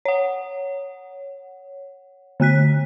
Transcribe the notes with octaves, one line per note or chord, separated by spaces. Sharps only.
C#5 F#5
D3 A3 F#6 B6